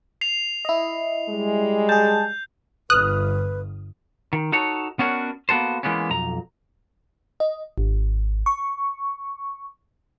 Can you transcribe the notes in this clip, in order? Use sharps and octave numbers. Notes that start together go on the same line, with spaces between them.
C7 F7
E4 D#5
G3 G#3
G#4 A5 G6
G1 B4 D#6 F6 F#6
D#3
D#4 F#4 A4 C#5
B3 C#4 D4 F#4 A#4 C#5
A#3 B3 F#4 A4 C5
E3 G#3 A#3 B3 C#4
B1 F2 A#5
D#5
G#1
C#6